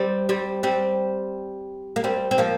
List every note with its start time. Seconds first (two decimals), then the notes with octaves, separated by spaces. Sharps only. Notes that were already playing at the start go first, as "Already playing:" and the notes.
Already playing: G3 C4
0.29 G3 C4
0.63 G3 C4
1.96 A#3
2.04 G3 C4
2.31 C4
2.38 F3 A#3